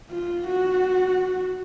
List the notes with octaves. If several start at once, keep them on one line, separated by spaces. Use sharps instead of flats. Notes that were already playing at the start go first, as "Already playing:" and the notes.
F4
F#4